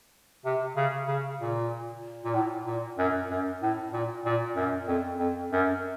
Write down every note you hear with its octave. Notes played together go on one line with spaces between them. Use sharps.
C3
C#3
C#3
A#2
A#2
A2
A#2
F#2
F#2
A2
A#2
A#2
F#2
F2
F2
F#2